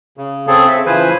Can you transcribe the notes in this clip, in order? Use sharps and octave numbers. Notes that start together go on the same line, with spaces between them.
C#3
C#3 C4 G#4 A4
E5
C#3 E3 F3 B4 C5 G#5